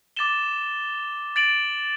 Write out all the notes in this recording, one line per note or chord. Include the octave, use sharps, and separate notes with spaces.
D6 A6 E7 G7
A6 D7 F#7